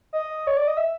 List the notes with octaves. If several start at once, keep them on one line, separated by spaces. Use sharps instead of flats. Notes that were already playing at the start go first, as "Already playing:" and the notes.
D#5
C#5
D5
D#5
E5